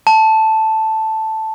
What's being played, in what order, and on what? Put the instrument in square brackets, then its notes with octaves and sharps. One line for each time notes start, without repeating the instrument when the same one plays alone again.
[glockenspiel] A5